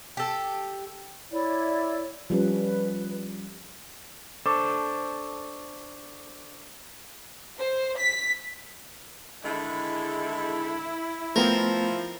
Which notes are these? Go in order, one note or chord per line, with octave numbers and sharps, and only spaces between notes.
G4 A4
E4 C#5 D5
F3 G3 C#4 B4
D4 A4 C5 C#6 D6
C5
B6
D3 D#3 G#3 E4
F3 A3 B3 C4 A#4